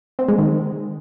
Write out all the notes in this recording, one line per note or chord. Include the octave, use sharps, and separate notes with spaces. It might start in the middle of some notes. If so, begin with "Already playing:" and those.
C4
G#3
D#3